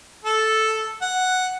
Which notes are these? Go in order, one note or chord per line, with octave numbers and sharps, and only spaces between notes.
A4
F#5